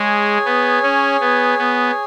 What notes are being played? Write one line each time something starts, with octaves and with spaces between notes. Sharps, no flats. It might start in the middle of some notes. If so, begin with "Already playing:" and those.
Already playing: G#3 G#4 C#5 G#5
B3
C#4
B3
B3